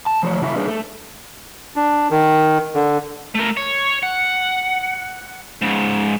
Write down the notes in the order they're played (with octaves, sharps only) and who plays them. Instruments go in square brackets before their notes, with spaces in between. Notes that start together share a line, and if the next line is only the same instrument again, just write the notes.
[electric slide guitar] A5
F3 A3 C#5
C#3 E4 F#4 E5
G3 D4 G#4 B4 C#5
A3
[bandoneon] D4
D#3
D3
[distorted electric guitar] A3 A#4
C#5
F#5
G#2 C#3